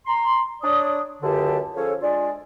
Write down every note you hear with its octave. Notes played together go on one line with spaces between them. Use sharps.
A#5 C6
D4 C#5 D5 D#6
C#2 F#2 D3 G4 A5
F3 C#4 G#4 A4 C#5
G#3 D4 F4 D5